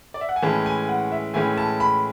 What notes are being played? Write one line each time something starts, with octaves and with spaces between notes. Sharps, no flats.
D5
E5
F#5
G#5
A2 E3 G#3 C#4 A5
G#5
F#5
E5
A2 E3 G#3 C#4 G#5
A5
B5